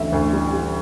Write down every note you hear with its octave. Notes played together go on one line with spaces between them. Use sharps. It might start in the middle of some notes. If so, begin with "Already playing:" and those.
Already playing: A1 D2 E5
D2
G3
G3